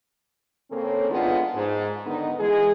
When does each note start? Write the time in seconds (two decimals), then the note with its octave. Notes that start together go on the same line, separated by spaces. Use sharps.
0.70 C#3 A#3 C4 C#4 A4
1.10 D#3 G#3 B3 D4 F4
1.54 G#2
2.06 D3 D#3 B3 D#4
2.39 E3 G#3 G#4